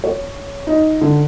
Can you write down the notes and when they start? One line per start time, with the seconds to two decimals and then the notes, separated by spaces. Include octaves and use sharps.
0.04 C#5
0.67 D#4
1.01 D3